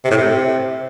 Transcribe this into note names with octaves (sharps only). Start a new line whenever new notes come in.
C3
A2
C3